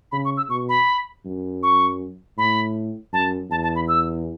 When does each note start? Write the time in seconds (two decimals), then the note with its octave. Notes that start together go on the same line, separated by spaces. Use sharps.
0.12 C#3 B5
0.25 C#6
0.37 E6
0.49 B2 C#6
0.69 B5
1.25 F#2
1.63 C#6
2.37 A2 B5
3.13 F#2 A5
3.50 E2 A5
3.63 A5
3.76 B5
3.88 E6